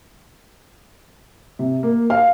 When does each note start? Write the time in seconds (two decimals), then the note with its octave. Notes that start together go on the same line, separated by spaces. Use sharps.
1.59 C3
1.83 A#3
2.10 F5